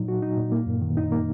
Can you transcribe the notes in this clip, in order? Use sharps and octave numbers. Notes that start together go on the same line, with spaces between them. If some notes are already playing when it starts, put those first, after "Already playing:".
Already playing: A#2 F#3 D#4
F#4
D#4
A#2
A#3
F#2
D#3
D#4
A#3